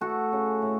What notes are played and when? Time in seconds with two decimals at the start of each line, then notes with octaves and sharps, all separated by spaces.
0.01 A3 F#4 A4
0.32 C#3
0.62 A2